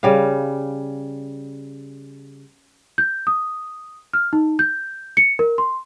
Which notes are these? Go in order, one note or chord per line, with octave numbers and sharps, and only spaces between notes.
C#3 G3 F5
G6
D#6
F6
D#4
G6
C#7
A#4
C6